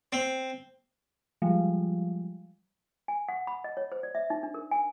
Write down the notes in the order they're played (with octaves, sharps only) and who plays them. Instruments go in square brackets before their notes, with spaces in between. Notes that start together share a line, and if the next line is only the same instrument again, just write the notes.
[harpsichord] C4
[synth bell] F3 G3 G#3
[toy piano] G#5
F#5
B5
D#5
C#5
C5
D5
E5
D#4
D4
A#4
G#5